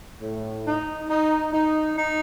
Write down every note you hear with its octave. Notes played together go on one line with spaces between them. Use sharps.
A2
D#4
D#4
D#4
D#4